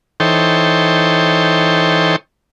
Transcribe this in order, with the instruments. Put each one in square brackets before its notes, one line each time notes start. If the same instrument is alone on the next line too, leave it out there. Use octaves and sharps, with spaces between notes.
[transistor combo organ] E3 D#4 A4 C5 C#5 G5